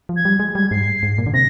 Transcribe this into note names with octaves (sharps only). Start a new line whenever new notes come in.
F3
G#6
G3
G#3
G3 G#6
G#2 C7
G#2
A#2
D3
C3 A#6